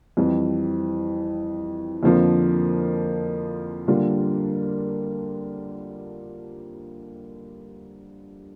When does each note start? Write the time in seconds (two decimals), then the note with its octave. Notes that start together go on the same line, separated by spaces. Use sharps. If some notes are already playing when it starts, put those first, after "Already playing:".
0.17 F2 E3 G3
2.03 F2 D3 F3 A#3
3.88 D3 G3 A#3 D4 F4